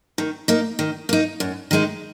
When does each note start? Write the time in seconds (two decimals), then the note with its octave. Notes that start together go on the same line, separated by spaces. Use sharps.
0.18 D#3
0.48 A#3 D#4
0.79 D#3
1.09 A#3 D#4
1.40 F#2
1.71 D#3 G#3 D#4